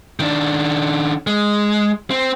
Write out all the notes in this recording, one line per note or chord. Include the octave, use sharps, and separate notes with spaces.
D#3 D4
G#3
C4